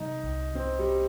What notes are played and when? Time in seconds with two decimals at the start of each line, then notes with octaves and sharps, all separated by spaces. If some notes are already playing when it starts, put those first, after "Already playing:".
Already playing: C3 G3 D#4
0.24 C2
0.54 C2 C4
0.79 G3